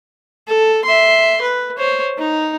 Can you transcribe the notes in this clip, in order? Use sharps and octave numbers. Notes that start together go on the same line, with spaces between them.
A4
E5 C6
B4
C5 C#5
D#4